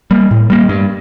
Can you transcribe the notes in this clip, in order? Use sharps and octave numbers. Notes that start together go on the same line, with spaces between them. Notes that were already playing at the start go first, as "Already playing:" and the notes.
G3 A#3
A2
G3 A#3
G2